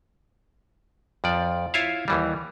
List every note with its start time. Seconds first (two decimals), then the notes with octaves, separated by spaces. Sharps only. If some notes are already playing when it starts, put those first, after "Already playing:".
1.24 F2 F3 D5
1.74 E4 F4 C#5 E5 F5
2.08 D#2 E3 G3